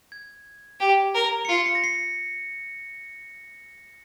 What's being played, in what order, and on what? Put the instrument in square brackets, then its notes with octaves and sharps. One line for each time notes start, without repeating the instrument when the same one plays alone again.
[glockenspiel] G#6
[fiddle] G4
A#4
[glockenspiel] C#7
[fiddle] F4 [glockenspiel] C7
[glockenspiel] C#7
A#6
C7